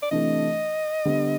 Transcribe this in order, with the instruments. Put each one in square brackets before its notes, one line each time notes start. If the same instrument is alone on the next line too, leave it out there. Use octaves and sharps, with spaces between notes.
[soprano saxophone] D5
[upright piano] C3 E3 A3 D4 [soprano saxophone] D#5
[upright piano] D3 G3 B3